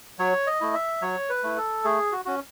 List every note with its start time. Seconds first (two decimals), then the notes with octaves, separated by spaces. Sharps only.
0.19 F#3 C#5
0.47 D#5
0.61 A3 E4
0.74 E5
1.02 F#3 C#5
1.30 B4
1.43 A3 E4
1.57 A4
1.84 A3 G#4
2.12 F#4
2.25 C#4 F#4